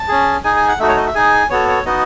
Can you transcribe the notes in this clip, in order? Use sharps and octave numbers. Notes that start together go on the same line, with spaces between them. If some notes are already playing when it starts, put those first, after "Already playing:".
Already playing: A5
C#4 G#4
D#4 G#4 G#5
G#5
F#5
A3 D#4 F#4 E5
C#5
D#5
E5
D#4 G#4 G#5
B3 F#4 A4 C#5
C#5
B3 D#4 F#4 D#5